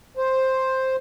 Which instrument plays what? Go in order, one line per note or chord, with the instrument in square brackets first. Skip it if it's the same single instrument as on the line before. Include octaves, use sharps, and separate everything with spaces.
[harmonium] C5